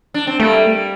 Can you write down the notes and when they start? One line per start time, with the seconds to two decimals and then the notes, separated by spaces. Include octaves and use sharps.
0.14 D4
0.27 C4
0.40 G3 A3 A#3